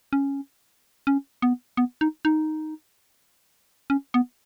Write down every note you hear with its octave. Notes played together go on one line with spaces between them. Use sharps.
C#4
C#4
B3
B3
D#4
D#4
C#4
B3